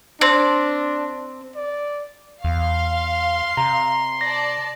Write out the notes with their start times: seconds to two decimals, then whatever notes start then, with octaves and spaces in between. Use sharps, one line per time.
0.21 C4 D4
1.56 D5
2.44 E2 F5 C6
3.57 C3 A#5
4.21 D5 A5 A#6